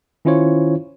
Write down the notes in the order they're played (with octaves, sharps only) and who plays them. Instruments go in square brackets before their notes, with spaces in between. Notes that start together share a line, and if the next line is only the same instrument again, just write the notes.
[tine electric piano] D#3 C#4 E4 F4 C5 C#5